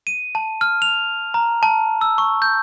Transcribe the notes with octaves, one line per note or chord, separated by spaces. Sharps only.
D#7
A5
F6
F7
A#5
A5
E6
C#6
G6